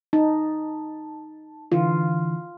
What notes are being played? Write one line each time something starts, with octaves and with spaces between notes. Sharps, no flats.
D#4 A5
D3 E3 F4